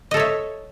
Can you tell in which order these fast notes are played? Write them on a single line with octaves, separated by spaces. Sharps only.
D#5 A4 C#5 E5